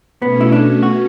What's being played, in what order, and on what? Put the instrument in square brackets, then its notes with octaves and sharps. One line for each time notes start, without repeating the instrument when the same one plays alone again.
[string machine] B2 A3 C#4 [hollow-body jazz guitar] B3
[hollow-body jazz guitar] E4
D4
F#4